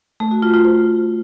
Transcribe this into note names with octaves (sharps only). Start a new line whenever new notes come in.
A3
F#4
F4
F4
C5